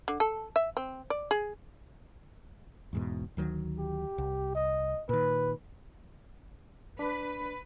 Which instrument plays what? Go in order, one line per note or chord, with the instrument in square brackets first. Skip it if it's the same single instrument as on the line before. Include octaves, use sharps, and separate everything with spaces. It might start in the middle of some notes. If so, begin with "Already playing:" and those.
[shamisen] D3
A4
E5
C4
D5
G#4
[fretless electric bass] E2 G#2 B2
D2 D#3 F#3
[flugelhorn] G4
[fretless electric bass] C2
[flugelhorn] D#5
[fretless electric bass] A#2 D#3 [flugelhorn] B4
[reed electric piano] D4 [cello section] B4